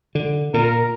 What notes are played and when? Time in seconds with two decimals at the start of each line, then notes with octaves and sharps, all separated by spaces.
0.15 D3
0.54 A#2 A#4